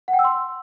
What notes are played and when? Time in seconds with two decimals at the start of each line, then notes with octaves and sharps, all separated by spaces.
0.08 F#5
0.13 G5
0.19 E6
0.24 C6